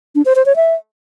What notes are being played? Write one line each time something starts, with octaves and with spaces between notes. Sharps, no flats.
D4
C5
C5
C#5
E5